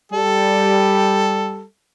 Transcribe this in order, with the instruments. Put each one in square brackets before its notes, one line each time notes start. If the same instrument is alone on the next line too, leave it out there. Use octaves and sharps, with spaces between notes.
[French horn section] G3 [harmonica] A4